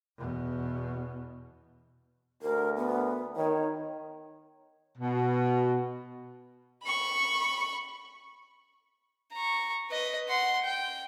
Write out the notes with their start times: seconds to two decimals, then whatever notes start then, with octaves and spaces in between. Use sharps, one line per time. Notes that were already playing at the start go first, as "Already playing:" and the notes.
0.18 E2 B2
2.42 D2 A#4
2.76 B3
3.36 D#3 C#5
4.98 B2
6.83 B5 C#6
9.33 A#5 C#6
9.90 B4 D#5
10.28 F#5 C6
10.63 G5